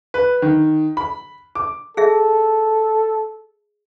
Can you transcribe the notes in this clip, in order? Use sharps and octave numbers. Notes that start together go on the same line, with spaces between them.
B4
D#3
B5
D6
G#4 A4 E5